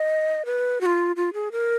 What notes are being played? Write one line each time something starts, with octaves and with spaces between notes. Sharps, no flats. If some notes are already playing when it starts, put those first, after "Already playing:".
Already playing: D#5
B4
F#4
F4
F4
G#4
A#4